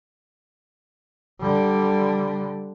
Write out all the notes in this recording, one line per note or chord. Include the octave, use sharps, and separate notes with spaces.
D3 G3